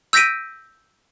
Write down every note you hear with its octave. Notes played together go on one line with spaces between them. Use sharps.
E6 G6 A#6 B6 D7 D#7